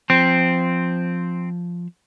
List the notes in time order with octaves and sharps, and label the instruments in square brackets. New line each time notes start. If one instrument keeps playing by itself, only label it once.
[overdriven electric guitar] F3 [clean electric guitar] C4